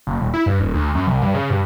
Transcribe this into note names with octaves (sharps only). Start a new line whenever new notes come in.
F#1
D#1
E4
G2
D#1
D2
F#2
C2
G2
C#3
G2